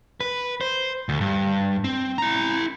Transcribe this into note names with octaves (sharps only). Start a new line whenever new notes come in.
B4
C5
D2
G2
C4
E4 A#5